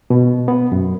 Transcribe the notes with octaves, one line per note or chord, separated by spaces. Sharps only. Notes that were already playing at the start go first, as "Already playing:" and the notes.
B2
B3
F#2